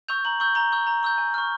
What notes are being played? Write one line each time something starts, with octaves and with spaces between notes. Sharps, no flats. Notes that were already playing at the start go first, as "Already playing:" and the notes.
C#6 E6 G6 F7
A#5 F#7
C#6 E6 G6
A#5 G7
C#6 E6 G6
A#5
C#6 E6 G6
G#5
C#6 F6